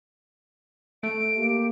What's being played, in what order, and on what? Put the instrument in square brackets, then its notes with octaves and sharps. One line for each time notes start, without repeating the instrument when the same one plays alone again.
[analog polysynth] A3 [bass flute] E5 [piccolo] D7
[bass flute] A#3 [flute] G4